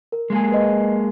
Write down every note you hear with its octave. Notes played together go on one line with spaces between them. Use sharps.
A#4
G#3 A#3 G#4
B4 D#5